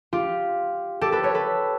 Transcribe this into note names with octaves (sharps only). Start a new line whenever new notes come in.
F4 G4
G4 A4
A4 B4
B4 C#5
A4 B4